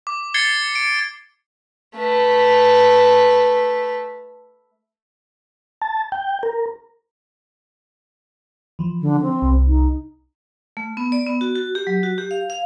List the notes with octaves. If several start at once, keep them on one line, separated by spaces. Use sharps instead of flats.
D6
G#6 A6 C7 C#7 G7
D7
A3 B4
A5
G5
A#4
E3 F3
D3
C4
C2
D#4
A3
B3
D5
B3
F#4
F#4
G4
F#3
F#4
G4
F5
F5